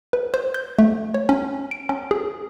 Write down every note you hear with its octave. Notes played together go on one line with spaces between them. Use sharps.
B4
C5
G6
A3
C#5
C#4
D7
C#4
G#4